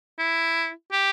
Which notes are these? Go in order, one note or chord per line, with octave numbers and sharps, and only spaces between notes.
E4
G4